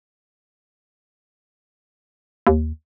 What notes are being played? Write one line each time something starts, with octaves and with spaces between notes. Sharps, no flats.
D#2